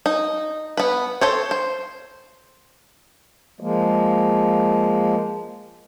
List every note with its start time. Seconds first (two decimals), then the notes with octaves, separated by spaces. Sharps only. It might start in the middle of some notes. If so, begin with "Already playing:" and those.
0.06 D#4
0.77 B3 B4
1.21 A4 C5 C#5
1.51 C5
3.60 F3 G#3 A#3